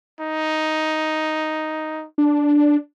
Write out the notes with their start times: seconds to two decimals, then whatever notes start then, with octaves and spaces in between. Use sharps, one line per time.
0.20 D#4
2.18 D4